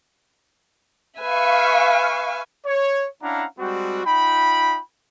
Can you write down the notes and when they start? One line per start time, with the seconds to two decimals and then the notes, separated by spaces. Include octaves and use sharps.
1.19 B4 E5 F5 G#5 C#6
2.66 C#5
3.22 C#4 D4 E4 F5 F#5 A#5
3.59 G3 G#3 C4 F#4
4.05 D#4 F4 G5 B5